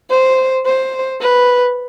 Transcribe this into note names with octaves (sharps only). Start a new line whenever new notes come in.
C5
C5
B4